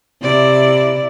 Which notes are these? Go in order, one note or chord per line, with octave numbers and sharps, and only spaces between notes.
C3 E4 D5